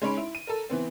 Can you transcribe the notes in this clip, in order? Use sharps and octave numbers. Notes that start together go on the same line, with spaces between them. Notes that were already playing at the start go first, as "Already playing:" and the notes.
G#3 C#4 D#4 C#5 B5 D7
E4
D#7
A4 A#4
E3 B3 C4